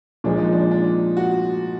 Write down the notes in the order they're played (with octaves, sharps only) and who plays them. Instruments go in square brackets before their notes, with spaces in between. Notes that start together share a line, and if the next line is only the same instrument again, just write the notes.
[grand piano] A#2 F3 G#3 [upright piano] D4
[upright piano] D#4
D4
D4
F#4